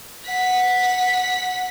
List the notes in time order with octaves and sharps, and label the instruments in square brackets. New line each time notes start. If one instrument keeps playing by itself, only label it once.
[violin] F#5 B6